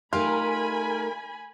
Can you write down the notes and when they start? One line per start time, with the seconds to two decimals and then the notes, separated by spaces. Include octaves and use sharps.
0.13 A3 D#4 F4 G4 A#4 G#5 B5